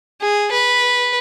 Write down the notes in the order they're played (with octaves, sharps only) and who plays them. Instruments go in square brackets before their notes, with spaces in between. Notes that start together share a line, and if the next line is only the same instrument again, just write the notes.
[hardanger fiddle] G#4
B4